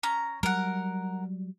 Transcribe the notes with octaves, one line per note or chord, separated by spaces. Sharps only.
C#4 A#5
F#3 G3 A#4 F#5